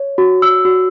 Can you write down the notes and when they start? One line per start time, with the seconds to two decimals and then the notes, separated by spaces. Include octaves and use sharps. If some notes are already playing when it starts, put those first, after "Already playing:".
Already playing: C#5
0.18 F#4
0.42 E6
0.65 F#4